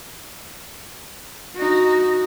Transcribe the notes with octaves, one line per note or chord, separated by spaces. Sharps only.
D#4 F#4